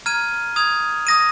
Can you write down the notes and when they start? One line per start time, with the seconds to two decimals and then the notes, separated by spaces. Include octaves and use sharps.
0.06 A#5 F6 G#6 D#7
0.56 D#6 G#6 F7
1.07 D#6 A#6 D#7